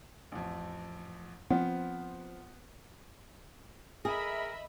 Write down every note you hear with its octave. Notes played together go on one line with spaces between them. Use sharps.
A1 F2
F3 B3 C4 C5 F#5
G#4 A#4 D#5 E5 B5